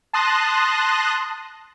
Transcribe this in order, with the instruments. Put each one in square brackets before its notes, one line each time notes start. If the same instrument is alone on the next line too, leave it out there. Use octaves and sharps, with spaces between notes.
[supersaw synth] A5 C6 D#6 F#6 A#6